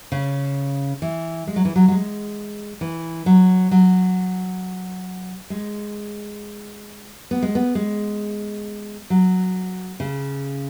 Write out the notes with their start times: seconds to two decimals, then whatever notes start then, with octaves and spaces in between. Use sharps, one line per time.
0.12 C#3
1.02 E3
1.47 G#3
1.56 F#3
1.65 E3
1.76 F#3
1.88 F#3
1.91 G#3
2.81 E3
3.26 F#3
3.71 F#3
5.50 G#3
7.31 B3
7.42 G#3
7.55 B3
7.75 G#3
9.10 F#3
10.00 C#3